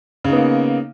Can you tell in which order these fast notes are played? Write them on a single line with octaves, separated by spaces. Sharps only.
C#3 D#4 B3 A#3